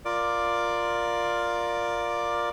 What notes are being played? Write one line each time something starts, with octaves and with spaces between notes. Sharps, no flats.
F4 A#4 D5 D6